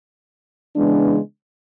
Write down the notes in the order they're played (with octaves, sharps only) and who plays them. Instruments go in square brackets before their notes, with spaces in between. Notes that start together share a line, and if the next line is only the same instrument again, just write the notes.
[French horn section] C#3 E3 G#3 B3 D4